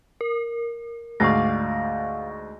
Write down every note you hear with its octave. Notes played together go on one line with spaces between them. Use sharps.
A#4
D2 G#2 F4 D5 F5 C#6 A#6